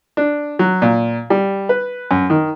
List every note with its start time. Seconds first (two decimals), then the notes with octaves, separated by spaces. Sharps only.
0.17 D4
0.59 F#3
0.82 A#2
1.30 G3
1.69 B4
2.11 F#2
2.30 D#3